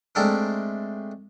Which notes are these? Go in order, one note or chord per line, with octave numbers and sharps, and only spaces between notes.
G#3 A3 C4 D4 A4 A#4